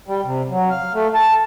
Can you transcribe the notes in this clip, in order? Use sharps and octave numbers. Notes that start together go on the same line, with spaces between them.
G3
C3
F#3
F5
A3
A5